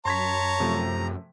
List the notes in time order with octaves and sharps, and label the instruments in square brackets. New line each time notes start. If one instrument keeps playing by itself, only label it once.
[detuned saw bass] F#2 [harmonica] C#5 A5 [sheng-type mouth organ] A#5 [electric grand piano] C6 G#6 B6
[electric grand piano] C3 F3 A3